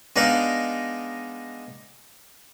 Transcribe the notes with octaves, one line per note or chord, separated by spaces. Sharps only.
G#3 B3 D4 D#4 D5 F5